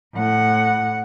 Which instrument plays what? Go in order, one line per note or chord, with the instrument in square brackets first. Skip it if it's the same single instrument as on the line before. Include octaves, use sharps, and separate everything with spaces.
[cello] A2 F#5